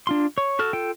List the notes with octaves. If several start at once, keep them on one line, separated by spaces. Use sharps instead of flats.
D4 F4 C6
C#5
F#4 A4 F6
F4 A4 G5